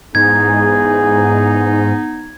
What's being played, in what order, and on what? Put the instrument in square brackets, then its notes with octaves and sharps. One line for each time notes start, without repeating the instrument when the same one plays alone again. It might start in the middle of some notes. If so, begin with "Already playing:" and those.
[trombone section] E2 G#4 [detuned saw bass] G#2 [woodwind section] B3 D#4 [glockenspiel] G#6